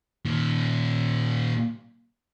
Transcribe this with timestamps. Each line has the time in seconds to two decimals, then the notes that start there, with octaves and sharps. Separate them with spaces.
0.25 A#2 D#3